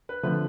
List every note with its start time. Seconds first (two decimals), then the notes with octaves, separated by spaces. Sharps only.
0.09 B4
0.23 D3 F3 A3 C4 B4